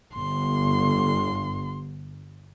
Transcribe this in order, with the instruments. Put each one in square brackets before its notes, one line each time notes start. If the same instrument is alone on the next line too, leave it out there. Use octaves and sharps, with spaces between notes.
[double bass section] G1 [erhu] C6